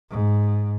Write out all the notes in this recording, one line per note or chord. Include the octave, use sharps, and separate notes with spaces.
G#2